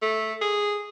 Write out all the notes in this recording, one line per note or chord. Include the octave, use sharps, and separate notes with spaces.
A3
G#4